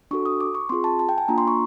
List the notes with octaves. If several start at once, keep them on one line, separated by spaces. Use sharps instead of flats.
D4 F#4 A4 C#6
D#6
D6
C#6
C4 F4 G#4 C6
A5
A5
G5
G#5
A#3 D4 F4 A#5
C6
C#6